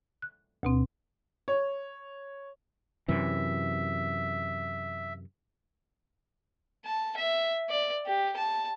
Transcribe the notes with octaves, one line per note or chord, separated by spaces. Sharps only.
F#6
D2 B2 C4
C#5
F#2 C3 E3 E5
A5
E5
D5
G4
A5